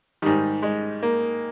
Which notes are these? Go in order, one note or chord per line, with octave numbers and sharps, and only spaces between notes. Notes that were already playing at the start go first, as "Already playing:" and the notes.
G#2 D#3 G3
G#3
A#3